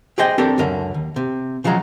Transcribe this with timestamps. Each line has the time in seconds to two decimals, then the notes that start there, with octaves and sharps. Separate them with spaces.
0.18 G4 G#4 C5 D#5 G5
0.38 C4 D4 G4 A4 A#4 D5
0.58 C#2 F#2 D3 A#4
0.94 D#2
1.16 C3
1.64 C#3 F3 F#3 G#3 A#5